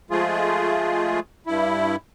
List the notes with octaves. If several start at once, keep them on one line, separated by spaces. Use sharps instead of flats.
F3 G#3 A3 F4 G#4
G2 E4